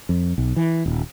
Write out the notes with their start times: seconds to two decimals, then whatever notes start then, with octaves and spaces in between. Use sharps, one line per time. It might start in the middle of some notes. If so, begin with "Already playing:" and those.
0.09 F2
0.38 B1
0.56 E3
0.86 D#1